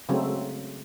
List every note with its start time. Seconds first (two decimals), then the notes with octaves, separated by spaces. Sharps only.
0.09 C#3 F#3 G#3 A3 C4